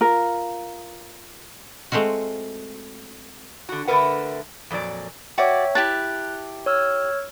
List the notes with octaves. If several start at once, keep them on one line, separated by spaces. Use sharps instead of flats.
F4 A#4
G#3 A3 C4 F4 F#4
D3 F#4
D3 A3 A#4 B4 F#5
F2 A#2 F#3 D5
F#4 C#5 D5 E5 G5 D6
E4 G4 A5 F#6
C#5 E6 F6